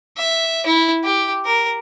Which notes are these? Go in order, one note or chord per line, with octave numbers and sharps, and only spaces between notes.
E5
E4
G4
A#4